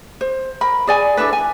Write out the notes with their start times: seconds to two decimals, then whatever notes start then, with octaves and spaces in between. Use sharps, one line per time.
0.21 C5
0.61 A#4 B5
0.87 G#4 D5 G#5
1.17 D4 E4 A4 B4
1.33 G#5